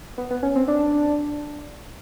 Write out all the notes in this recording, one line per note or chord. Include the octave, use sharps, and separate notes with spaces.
B3
B3
C#4
C4
D4